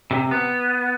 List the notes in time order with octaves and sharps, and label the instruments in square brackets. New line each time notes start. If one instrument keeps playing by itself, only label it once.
[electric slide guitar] C3
B3